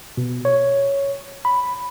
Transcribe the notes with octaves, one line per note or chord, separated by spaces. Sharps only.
B2
C#5
B5